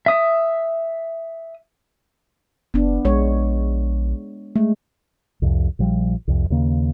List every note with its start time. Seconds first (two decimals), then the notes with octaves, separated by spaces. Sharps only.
0.06 E5 D#6
2.74 F#1 B3 D4
3.05 A#1 G#3 C#5
4.56 G#3 A3
5.42 C2 F2
5.79 A#1 F3 G3
6.28 C2 F2
6.50 D#2 C#3 A#3